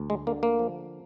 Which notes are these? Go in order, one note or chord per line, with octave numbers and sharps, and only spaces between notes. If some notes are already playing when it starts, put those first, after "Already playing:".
Already playing: D2
G#3
D3 A#3
A#3
F3